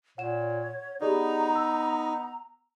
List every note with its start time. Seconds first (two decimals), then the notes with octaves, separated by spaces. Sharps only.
0.18 A#2 C#5 F#5 E7
1.01 B3 D#4 G4 G#4 D5 A#5
1.55 E6